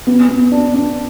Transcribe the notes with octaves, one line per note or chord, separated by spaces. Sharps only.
B3
B3
D4
D4